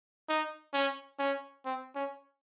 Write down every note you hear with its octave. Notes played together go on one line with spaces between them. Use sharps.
D#4
C#4
C#4
C4
C#4